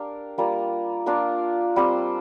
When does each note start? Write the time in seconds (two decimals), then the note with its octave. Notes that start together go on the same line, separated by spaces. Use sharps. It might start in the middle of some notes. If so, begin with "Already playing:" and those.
Already playing: D4 G4 A#4 F5
0.38 G3 A#3 F4 A#4
1.06 A#3 D4 F4 A#4
1.76 G3 C4 G4 C5